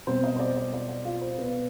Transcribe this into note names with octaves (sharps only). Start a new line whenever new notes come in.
B2 G3 C4 C5
D#5
C5
D5
D5
D5
D5
F4
C5
B2 B3 B4